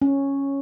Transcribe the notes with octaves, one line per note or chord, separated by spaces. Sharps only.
C#4